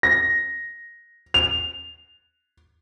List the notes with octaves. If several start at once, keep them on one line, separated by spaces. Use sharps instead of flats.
A#6
F7